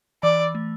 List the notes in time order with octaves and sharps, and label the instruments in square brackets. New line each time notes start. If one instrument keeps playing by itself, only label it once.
[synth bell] E3 [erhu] D5
[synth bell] A3